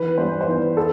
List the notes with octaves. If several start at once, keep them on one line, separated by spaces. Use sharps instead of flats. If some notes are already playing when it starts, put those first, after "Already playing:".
Already playing: E3 B4
G2 C5
C5
E3 B4
A4